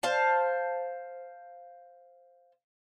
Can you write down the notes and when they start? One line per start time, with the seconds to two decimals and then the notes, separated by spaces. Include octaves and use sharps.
0.03 C5 F5 A5